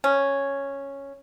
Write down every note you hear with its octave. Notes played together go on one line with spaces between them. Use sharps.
C#4